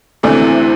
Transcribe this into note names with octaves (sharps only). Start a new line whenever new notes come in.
D2 C3 E3 A3 D4